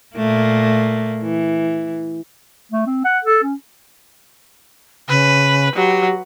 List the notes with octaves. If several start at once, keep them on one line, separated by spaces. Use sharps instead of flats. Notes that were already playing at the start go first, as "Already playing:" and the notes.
A#2 A3 A#3
E3
A3
C4
F#5
A4
C#4
C#3 B4
F#3 G4